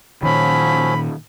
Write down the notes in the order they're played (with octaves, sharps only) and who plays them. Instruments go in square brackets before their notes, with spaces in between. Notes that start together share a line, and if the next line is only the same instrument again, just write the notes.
[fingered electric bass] A#2 D#3 [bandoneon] F3 F#3 C#4 [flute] B5